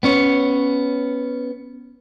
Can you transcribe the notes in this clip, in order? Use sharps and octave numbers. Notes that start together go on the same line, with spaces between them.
B3 C#4 C#5